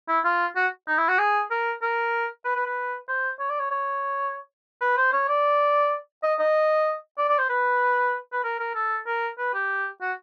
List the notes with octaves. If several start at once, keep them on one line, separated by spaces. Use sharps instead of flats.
E4
F4
F#4
D#4
E4
F#4
G#4
A#4
A#4
B4
B4
B4
C5
C#5
D5
C#5
C#5
B4
C5
C#5
D5
D#5
D#5
D5
D5
C5
B4
B4
A#4
A#4
A4
A#4
B4
G4
F#4